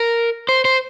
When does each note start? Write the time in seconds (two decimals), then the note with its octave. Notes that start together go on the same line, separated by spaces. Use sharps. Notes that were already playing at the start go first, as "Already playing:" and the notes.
Already playing: A#4
0.49 C5
0.65 C5